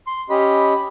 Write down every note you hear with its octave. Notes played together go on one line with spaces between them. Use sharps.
C6
C#4 G4 D#5 B5